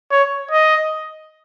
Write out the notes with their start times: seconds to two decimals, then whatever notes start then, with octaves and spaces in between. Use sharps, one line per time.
0.11 C#5
0.51 D#5